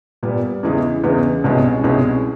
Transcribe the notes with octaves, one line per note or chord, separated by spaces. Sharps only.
A#2 G3 B3
E2 C#3 E3 G#3 B3
E2 C#3 E3 G#3 B3
C2 B2 G#3 C#4
C2 B2 G#3 C#4